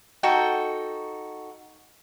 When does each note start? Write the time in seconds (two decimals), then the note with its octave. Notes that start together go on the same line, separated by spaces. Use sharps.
0.23 D#4 F#4 A4 G5